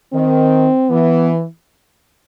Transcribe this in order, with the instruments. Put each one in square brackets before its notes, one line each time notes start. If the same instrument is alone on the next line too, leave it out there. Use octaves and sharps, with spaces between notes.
[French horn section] D#3 [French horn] C4
[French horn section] E3 [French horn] B3